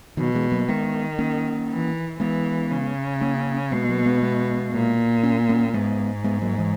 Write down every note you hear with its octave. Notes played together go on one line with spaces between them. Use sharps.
B2 D#3 F#3
E3 G#3
F#3 A#3
D#3 G#3 B3
A#3 C#4
E3
E3 G#3 B3
C#3
A#3 C#4
B2 G#3 B3
F#3 A#3
G#3 B3
G#3 B3
A#2
C#4
A#3 C#4
G#2 G#3 B3
G#3 B3
F#3 A#3
E3 G#3